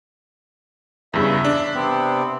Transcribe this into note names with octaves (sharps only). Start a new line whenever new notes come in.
E2 G2 C#3 E5
D4
C3 B3 C4